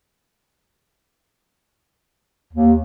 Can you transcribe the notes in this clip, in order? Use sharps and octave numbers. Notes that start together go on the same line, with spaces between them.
D#2